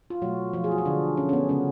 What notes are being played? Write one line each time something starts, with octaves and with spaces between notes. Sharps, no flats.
F4
B2 F#3 A3 F#4
F3 F4
G#4
F#4
F4
D3 D4
C#4
C#4
B3
C#3 G#3 C#4